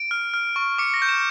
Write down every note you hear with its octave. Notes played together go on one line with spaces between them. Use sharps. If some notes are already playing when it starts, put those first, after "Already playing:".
Already playing: D7
F6
F6
C#6
D6 C#7
A#6
G6
E7